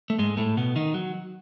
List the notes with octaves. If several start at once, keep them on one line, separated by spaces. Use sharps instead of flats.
A3
G#2 G#3
A2 A3
B2 B3
D#3 D#4
F#3